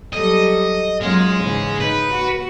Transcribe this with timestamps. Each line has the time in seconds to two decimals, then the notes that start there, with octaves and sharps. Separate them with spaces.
0.13 F#3 G3 A4 D#5
1.01 F#2 F#3 G#3 F4
1.41 G#2 C#3 E3
1.80 D#4 B4
2.11 F#4